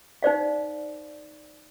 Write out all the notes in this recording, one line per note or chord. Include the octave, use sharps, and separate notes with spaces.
D#4 C5 D5 F5